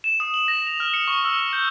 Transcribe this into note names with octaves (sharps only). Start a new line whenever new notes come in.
E7
D#6
F#7
A#6
F7
F6
C#7
C#6
E6
G6